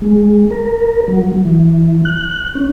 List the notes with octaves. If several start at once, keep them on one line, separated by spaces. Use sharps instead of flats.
G#3
A#4
F#3
E3
F#6
C#4